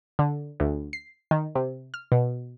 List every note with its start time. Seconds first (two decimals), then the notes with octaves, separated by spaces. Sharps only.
0.19 D3
0.60 D2
0.93 C7
1.31 D#3
1.55 C3
1.94 F6
2.12 B2